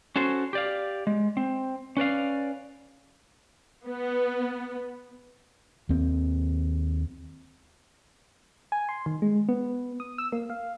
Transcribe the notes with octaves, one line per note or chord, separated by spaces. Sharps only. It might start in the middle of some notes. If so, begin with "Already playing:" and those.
C#4 F#4 A4 C5
G4 D5 F5
G#3
C4
C#4 B4 D5 F5
B3
D#2 C4
G#5
C6
D#3
G#3
B3
D#6
E6
A#3
F5